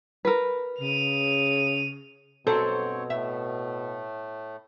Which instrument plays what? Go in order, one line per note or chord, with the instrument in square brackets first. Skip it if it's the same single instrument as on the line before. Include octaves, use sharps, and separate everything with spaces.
[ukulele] A#4 B4
[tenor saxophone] C#3 [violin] D#7 F7
[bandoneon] G2 C#5 [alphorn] B2 [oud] F#3 C4 C5 [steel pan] A4
[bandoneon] A2 A3 [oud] E5